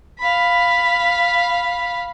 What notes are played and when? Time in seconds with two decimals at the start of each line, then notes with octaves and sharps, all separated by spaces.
0.20 F5 B5